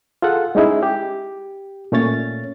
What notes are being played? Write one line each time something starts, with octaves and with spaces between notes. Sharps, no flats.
F4 G#4 A4 F#5
G#3 C#4 D#4 E4 G#4
G4
A#2 A3 C#4 C#5 A6